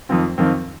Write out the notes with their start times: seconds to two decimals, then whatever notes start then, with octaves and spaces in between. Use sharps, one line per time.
0.09 F2 D#3 C4 F4
0.38 F2 D#3 C4 F4